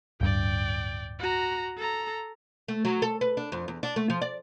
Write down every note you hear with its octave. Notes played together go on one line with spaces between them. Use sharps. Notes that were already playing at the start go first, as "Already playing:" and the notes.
D1 G2 D5 G5
F#4 A#5
A4 A#5
A3
F#3
A4
B4
D4
F2
E2
D4
A3
F3
D5